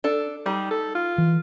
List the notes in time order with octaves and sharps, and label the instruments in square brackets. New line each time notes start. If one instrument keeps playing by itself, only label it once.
[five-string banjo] D4 A4
[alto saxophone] G3 [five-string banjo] D#4
[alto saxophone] A4
F4
[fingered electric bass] E3